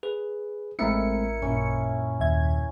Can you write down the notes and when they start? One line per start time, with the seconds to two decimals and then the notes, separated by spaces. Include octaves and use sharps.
0.03 G#4 B4
0.79 A1 G#3 A3 C4 E4 A#4 C#7
1.42 F#2 A#2 C#4 E4
2.20 D#2 E5 G#6